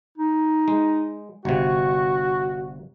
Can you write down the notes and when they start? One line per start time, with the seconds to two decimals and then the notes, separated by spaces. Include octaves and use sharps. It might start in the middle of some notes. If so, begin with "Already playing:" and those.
0.18 D#4
0.68 G#3
1.45 G1 C3 F#4 C#6